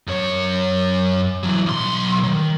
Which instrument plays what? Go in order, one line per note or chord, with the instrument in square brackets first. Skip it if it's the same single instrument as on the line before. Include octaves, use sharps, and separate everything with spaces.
[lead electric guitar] F#2 C#5
E3 F#3
B1 C6
D#3 F#3